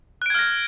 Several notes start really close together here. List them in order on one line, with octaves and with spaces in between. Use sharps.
F#6 D7 G#6 F6 A#6